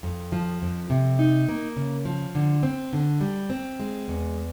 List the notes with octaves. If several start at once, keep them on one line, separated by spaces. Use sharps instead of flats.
F2
F3
F2
C3
D#4
A#3
C#3
F3
D3
C4
D3
G3
C4
G#3
E2